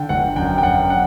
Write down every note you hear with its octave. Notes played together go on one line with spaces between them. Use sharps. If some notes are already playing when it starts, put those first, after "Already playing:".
Already playing: D3 G5
G1 F#5
F#2 G5
G5
F#2 F#5
F#5